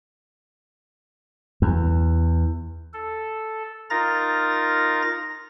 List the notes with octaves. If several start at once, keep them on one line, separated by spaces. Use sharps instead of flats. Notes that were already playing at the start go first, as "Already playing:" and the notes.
E2
A4
D#4 F4 A#4 A#5 A6 A#6